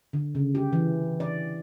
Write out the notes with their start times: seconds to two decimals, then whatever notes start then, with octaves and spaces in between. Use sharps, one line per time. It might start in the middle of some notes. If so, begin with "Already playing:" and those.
0.13 D3
0.35 C#3
0.55 G4
0.73 E3
1.20 D5